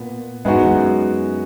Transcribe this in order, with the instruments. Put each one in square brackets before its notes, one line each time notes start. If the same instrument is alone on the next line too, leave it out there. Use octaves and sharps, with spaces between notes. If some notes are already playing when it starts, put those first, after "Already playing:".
Already playing: [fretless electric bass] A#2 [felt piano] B3
[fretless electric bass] G#2 [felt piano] G#3 B3 D#4 F#4
[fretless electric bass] F#2
E2
F#2